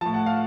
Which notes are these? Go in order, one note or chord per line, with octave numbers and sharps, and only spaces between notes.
A2 F3 A5
F#5
F5